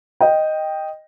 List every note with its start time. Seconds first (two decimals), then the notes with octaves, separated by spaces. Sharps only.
0.21 D#5 G5